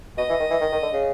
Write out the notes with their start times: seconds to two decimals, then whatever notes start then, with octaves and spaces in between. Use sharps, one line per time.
0.18 B2 D#5
0.29 E3
0.40 D#3
0.50 E3
0.61 D#3
0.72 D#3
0.83 D3
0.93 C#3